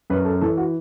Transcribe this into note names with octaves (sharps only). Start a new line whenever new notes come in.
F#2 B4
A4
E3 A4
F#4